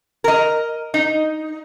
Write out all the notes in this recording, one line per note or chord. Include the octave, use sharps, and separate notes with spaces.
A#4 D#5
D#4